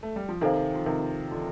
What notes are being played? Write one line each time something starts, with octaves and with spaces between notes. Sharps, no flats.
A3
G3
F3
C3 D#3 D#4 A4 C5 F5
F3
C3 D#3
D3 F3